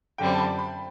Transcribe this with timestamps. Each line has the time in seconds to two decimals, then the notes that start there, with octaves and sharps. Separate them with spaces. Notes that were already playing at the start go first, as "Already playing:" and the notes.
0.18 F#2 D3 G3 C4 G5
0.34 A5
0.38 B5
0.59 B5